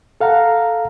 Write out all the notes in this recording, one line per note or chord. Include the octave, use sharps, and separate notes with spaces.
A4 F5 F#5 A#5